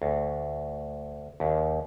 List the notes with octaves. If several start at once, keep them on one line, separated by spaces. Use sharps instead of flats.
D2
D#2